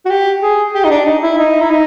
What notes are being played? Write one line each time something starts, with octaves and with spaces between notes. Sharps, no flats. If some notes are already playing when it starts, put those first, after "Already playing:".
F#4
G4
G#4
G4
D#4
D4
D#4
E4
D#4
E4
D#4